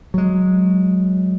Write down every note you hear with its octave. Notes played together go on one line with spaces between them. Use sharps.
F#3 G#3